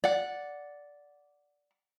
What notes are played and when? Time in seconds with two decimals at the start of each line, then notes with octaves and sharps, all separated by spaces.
0.04 D5 F#5